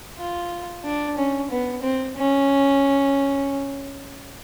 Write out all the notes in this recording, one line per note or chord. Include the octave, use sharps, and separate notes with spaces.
F4
D4
C#4
B3
C4
C#4